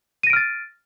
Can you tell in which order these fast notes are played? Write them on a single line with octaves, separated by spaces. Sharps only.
D#7 A#6 D7 F6 A6